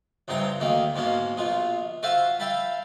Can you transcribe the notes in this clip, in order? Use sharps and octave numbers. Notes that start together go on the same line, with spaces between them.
C#2 G2 C3 C4 G5 A#5
D2 D#3 A#3
G#2 B2 A#3 C#4
A#1 B2 F4
F4 F#4 C5 E5 F5
E5 F5 G5 A5 B5